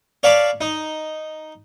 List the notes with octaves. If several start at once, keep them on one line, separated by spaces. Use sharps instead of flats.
C#5 D5 F5 A5 B5 D6
D#4